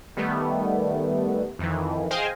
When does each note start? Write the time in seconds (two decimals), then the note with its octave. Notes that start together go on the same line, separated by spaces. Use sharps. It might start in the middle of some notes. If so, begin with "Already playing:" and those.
0.17 D#3 G3 A3 B3
1.59 F2 D#3 E3
2.11 G#4 C5 D#5 F5 G5 G#5